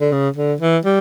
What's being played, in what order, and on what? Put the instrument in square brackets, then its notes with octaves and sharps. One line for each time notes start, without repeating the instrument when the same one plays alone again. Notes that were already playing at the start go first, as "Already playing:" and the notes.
[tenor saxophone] D3
C#3
D3
E3
G3